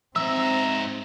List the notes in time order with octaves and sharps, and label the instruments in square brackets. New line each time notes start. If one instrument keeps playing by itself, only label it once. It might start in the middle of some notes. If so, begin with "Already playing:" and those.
[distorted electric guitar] G#2 E5 [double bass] C4 [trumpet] A#5 [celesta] E6